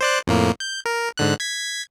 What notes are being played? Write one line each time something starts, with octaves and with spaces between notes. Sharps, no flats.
C5 D5 F#6
F2 A2 A#3
G6
A#4
G#2 D3 F#6
G#6 B6